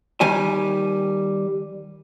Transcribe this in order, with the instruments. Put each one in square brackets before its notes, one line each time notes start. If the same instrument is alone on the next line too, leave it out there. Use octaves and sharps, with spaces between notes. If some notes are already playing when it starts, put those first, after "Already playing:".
[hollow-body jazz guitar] D#3 G3 G#5